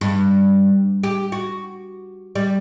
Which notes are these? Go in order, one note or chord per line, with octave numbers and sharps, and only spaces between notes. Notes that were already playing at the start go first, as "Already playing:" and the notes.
G2
G4
F#4
G3